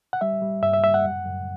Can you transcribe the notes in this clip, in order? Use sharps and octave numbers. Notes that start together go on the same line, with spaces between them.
F#5
G3 E5
G3
G2 E5
E5
G3 E5
F#5
F#2
F#2